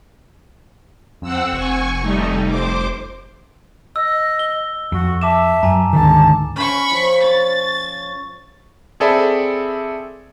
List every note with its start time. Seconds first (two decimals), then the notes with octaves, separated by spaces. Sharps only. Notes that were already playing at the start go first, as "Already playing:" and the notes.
1.22 F2 C4 F#5 E6
1.53 F1 G#5 C#6
2.00 G3 A3 D#4
2.48 C5 D6
3.96 D#5 E6
4.39 G7
4.92 F2 F#4
5.22 E5 A5 D6 E7
5.63 F#2 G#5 A#5
5.93 D2 G#2 D#3 A5
6.56 C#4 B5 C#6
6.91 F3
7.23 C#5 A6
9.00 C4 G#4 A4 D5 E5 B5